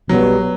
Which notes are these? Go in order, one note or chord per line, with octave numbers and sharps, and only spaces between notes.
B1 B2 F#3 G3 B3